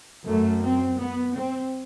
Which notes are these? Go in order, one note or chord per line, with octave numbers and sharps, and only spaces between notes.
F#2 A3
C4
B3
C4